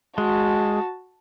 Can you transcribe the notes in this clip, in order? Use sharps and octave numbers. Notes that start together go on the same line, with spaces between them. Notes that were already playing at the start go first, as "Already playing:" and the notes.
G#3 F#4 A5